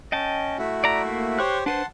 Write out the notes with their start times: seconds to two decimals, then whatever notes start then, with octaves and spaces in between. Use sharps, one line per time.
0.12 C#4 D#5 G5 A5
0.58 A3 E4 F#4
0.84 D5 A#5
1.05 A#3
1.39 G4 C5 C#5 C6 C#6 F#6
1.66 D4 B4 C5 F#5 A5 C6